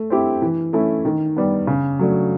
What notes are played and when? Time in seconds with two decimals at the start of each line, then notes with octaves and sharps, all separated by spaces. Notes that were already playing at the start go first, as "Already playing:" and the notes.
Already playing: A3
0.10 C4 E4 G4
0.42 E3
0.73 A3 C#4 E4
1.05 D#3
1.37 G3 B3
1.67 C#3
1.99 F#3 A3 D4